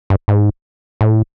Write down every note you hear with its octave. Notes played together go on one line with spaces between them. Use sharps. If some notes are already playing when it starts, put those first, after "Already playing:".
G2
G#2
A2